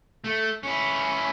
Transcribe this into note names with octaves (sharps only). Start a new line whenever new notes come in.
A3
C#4 E4